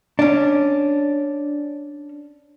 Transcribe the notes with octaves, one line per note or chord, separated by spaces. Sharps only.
C#4 D4